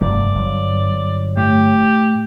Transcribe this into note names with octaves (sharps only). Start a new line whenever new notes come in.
F1 G2 D5
G1 F#3
A2 G4